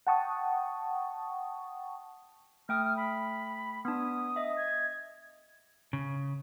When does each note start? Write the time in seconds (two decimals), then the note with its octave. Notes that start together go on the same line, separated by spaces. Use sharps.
0.07 F#5 G5 A5 C#6 D#6
2.69 A3 G5 D#6 F6
2.85 F6
2.97 B5
3.85 B3 D4 D#6
4.36 D#5 E5
4.57 G#6
5.93 C#3